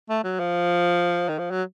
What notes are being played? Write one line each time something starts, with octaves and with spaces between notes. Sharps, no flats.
A3
F#3
F3
D#3
F3
F#3